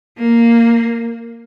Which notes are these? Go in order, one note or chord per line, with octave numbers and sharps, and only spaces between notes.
A#3